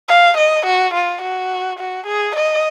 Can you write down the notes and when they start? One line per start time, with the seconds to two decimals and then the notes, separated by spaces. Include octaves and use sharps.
0.08 F5
0.37 D#5
0.66 F#4
0.94 F4
1.22 F#4
1.79 F#4
2.07 G#4
2.36 D#5